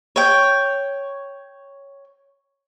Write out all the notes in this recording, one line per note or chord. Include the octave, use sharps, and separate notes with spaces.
C#5 G5